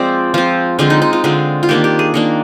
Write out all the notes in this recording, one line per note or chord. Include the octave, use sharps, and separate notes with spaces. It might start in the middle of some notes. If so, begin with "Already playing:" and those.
Already playing: F3 G#3 C4 D5 F5
F3 C4 F4
D3 G#3 C4 F4
D#4
D#4
F4
D3 G#3 C4 F4
F4
D#3 A#3 D4 G4
G4
G#4
D#3 A#3 D4